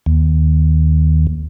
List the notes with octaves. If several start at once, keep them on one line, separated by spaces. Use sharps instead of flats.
D#2